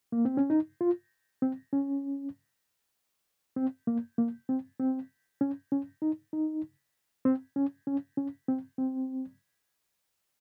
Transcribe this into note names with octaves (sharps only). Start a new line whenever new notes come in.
A#3
C4
C#4
D#4
F4
C4
C#4
C4
A#3
A#3
C4
C4
C#4
C#4
D#4
D#4
C4
C#4
C#4
C#4
C4
C4